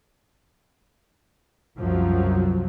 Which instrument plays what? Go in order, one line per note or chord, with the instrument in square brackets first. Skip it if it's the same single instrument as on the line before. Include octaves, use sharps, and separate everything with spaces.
[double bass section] C2 F#2 F3 F#3